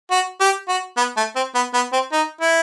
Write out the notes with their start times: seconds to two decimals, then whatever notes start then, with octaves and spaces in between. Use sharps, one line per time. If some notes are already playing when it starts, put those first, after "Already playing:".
0.11 F#4
0.40 G4
0.68 F#4
0.97 B3
1.17 A3
1.36 C4
1.55 B3
1.74 B3
1.93 C4
2.12 D#4
2.41 E4